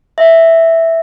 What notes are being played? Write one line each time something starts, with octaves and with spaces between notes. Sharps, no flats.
E5